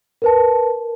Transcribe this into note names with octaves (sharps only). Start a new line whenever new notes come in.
A#4 B4 A5